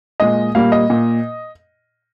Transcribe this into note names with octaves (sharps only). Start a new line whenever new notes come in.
A#2 G#3 D#5
A#2 G3 A#3 F5
D#5
A#2